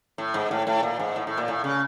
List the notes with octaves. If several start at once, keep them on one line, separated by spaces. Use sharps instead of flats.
A2
G#2
A2
A2
A#2
G#2
A2
A2
A#2
A2
C#3